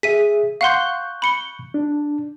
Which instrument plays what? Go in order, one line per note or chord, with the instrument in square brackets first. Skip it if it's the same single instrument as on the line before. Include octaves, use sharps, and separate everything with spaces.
[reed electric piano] G#4 E5 [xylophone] B6 D#7
[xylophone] F5 F#5 C6 [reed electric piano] C#6 F#6 G6
[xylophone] B5 C#7 G7
[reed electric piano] D4